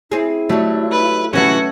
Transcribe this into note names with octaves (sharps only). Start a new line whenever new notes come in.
C4 E4 G#4
F#3 G3 A3
B4
C3 E3 A3 C#4 F#4 B4